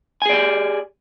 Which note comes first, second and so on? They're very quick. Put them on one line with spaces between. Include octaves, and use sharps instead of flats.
G#5 G#4 D5 G4